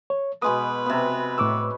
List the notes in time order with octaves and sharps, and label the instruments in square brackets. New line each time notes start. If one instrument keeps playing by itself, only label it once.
[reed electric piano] C#5
[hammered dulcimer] B2 G#3 B3 [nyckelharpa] B4 [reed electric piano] D#6
[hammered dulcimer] C3 B3
[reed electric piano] A2 D6 E6 [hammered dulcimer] C#5